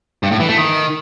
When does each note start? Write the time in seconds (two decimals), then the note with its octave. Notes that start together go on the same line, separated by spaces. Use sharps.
0.23 G2
0.31 A2
0.40 E3
0.48 A3
0.57 D#3